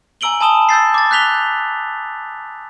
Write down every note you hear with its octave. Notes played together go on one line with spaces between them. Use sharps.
G#5 A#5 E6 D7 F#7 G7
G#5 A5 B5 D#6 E7 G7
E6 G6 A6 C7
D6 A6
F#6 G6 B6 F7 G7